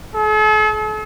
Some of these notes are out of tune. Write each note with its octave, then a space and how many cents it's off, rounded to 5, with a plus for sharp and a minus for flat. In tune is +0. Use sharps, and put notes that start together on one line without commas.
A4 -45